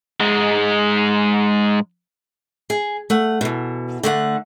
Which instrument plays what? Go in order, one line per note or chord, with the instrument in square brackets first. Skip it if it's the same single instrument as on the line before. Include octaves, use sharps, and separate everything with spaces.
[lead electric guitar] G#2 G#3
[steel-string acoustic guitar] G#4
A3 F#5
E2 B2
D3 A3 F#5